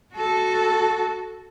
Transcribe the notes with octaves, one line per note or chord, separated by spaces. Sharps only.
F#4 A4